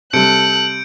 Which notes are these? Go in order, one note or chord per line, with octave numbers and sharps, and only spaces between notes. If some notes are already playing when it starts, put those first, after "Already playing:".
C3 G3 A4 F#6 G6 C#7 D7